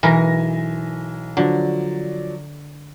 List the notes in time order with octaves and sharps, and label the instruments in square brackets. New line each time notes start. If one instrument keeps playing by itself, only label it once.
[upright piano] B1 G#5 A#6 [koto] E3 A#4
[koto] D3 [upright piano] F3 F#3 D5